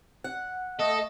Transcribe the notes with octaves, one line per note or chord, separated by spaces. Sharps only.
F#5
A3 A4 D#5